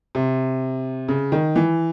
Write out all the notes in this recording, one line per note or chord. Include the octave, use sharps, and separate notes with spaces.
C3
C#3
D#3
E3